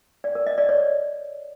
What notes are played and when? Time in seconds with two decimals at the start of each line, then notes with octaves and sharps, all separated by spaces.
0.24 D5
0.35 A#4
0.46 D#5
0.58 D5
0.69 C#5